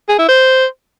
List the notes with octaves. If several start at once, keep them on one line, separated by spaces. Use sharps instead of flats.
G#4
E4
C5